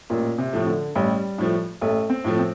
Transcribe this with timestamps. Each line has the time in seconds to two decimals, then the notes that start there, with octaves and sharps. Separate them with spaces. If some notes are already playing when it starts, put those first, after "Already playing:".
0.10 A1 A#2
0.38 C3
0.53 A2 F3 A3
0.67 D3
0.95 A1 G3
1.38 A2 F3 A3
1.81 A1 A3
2.10 C4
2.24 A2 F3 A3
2.39 C4